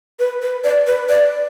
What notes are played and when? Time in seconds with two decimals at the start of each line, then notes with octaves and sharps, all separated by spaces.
0.19 B4
0.42 B4
0.64 D5
0.87 B4
1.09 D5